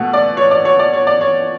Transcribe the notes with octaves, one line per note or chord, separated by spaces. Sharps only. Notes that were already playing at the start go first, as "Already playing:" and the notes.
Already playing: B2 A3 F#5
D5
C#5
D5
C#5
D5
C#5
D5
C#5